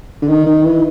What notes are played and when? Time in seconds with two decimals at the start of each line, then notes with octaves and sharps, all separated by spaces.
0.22 D3
0.28 D#3
0.46 D#3
0.64 E3